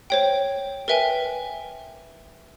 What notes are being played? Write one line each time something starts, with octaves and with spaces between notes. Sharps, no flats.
C5 C#5 G5
A#4 B4 E5 G5 G#5